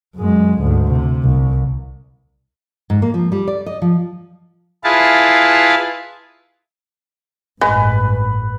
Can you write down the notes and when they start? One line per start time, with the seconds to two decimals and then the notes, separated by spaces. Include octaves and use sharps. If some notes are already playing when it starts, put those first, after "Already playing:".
0.15 F#2 G#3
0.59 D2 G#2
0.91 C3
1.23 C2
2.90 G#2
3.02 A#3
3.14 F3
3.32 G3
3.47 D5
3.66 D#5
3.82 F3
4.84 E4 F4 G#4 B4 F5 A5
7.61 A1 G2 G#3 B4